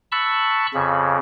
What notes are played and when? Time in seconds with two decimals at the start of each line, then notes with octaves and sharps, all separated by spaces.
0.12 A5 B5 C#6 E6 F#6
0.74 F2 C#3